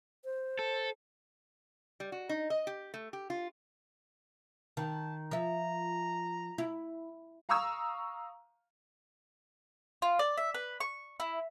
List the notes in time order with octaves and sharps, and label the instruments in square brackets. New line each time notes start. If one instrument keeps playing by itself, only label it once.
[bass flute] C5
[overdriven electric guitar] A4
[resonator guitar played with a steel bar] G3
F#4
D#4
D#5
G4
A3
G4
F4
[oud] D#3 [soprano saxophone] A5
[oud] F3 E5 [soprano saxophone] A#5
[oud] E4
[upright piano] F5 A#5 C#6 D#6 E6
[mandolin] F4
D5
E5
B4
C#6
E4